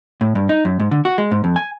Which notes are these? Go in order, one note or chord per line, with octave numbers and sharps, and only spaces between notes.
A2
G2
D#4
F#2
G#2
D3
F#4
G#3
G#2
F2
G#5